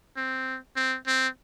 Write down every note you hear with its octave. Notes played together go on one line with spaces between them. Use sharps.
C4
C4
C4